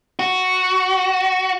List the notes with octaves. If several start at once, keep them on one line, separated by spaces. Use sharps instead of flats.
F#4